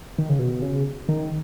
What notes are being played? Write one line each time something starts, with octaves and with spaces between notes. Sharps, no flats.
D#3
C#3
B2
C#3
D#3